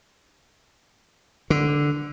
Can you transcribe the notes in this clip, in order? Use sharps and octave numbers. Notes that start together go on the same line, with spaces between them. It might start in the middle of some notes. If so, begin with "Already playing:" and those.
D3